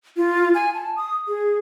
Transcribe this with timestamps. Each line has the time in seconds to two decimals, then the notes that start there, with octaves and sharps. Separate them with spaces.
0.17 F4
0.55 G#5
0.74 A5
0.97 D#6
1.28 G#4